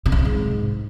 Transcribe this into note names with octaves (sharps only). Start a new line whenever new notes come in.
B2
C#3
B2
G#2